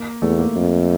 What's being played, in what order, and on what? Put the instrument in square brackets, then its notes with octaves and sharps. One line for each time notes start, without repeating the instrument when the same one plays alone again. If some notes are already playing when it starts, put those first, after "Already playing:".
Already playing: [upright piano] A#3
[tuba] E2 [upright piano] A3
[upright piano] A#3
[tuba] F2